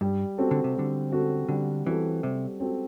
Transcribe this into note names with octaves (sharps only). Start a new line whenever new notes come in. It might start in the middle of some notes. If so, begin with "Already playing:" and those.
G2 G3
C4 F#4 A4
D3
C3
D3 G3
C4 F#4 A4
D3 G3
E3 C4 F#4 A4
C3 G3
C4 F#4 A4